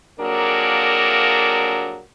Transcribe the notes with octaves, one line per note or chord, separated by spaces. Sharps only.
F2 F#3 A#3 D4 G#4 A#4